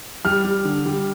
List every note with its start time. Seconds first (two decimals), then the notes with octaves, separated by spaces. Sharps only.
0.25 G3 F6
0.45 G3
0.65 D3
0.86 G3